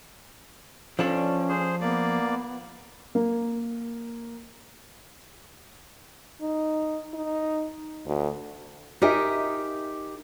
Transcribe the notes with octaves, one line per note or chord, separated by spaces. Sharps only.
F3 C#4 D4 A4
G#4 C5
A#3 B3 D5
A#3
D#4
D#4
D2
D#4 G4 A#4 D#5 E5 G#5